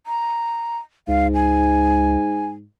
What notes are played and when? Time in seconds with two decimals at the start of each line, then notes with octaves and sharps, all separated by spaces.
0.07 A#5
1.08 C#2 G#2 F5
1.34 G#5